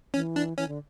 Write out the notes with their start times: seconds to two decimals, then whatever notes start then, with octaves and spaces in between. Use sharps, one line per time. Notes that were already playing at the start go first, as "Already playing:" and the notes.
0.14 E3 C#4
0.36 D4
0.57 E3 C#4
0.68 D3